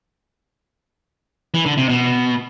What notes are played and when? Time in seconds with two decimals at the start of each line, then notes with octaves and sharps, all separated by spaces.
1.54 E3
1.66 D3
1.77 C3
1.89 B2